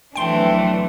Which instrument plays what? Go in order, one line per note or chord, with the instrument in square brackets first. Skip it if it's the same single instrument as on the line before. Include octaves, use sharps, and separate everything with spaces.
[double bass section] F1 F#3 B3 [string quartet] E3 A3 D4 [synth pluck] G5 C6